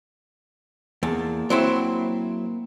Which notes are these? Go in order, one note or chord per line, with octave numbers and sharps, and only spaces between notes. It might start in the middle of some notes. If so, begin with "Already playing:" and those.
E2 A#3 A5
F#3 C4 E4